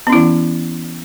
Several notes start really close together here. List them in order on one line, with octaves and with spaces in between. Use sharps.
B3 C#4 E4 E3